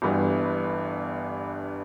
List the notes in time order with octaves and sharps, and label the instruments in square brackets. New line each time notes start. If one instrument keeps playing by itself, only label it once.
[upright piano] G1 G2 E3 B3